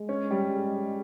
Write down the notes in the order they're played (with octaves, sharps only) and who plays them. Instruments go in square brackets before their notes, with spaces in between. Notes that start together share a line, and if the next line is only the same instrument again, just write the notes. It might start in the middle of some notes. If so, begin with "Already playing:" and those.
Already playing: [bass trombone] G#3
[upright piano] C#4
G3